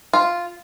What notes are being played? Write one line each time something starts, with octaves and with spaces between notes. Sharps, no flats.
F4